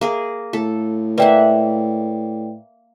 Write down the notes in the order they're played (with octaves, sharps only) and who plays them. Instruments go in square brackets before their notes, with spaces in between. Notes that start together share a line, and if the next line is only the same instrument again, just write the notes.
[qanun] A#3 G#4 A#4
[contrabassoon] A2 [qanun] A4
[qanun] A#3 E5 F#5 [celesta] B4 D5 G5